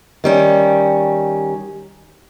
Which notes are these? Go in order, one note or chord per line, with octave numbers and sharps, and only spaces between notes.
D#3 G3 C#4